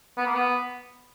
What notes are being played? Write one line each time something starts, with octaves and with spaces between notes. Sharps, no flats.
B3
A#3
B3